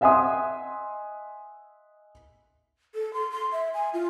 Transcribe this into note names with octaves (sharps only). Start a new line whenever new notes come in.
D#5 E5 F#5 G#5 C6 D#6
A4
C6
C6
E5
G#5
F4